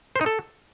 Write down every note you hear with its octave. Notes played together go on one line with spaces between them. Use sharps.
C5
D#4
A4